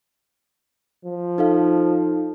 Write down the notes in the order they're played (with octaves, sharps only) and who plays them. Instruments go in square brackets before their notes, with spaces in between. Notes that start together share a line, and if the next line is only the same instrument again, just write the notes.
[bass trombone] F3
[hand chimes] D#4 A4 F5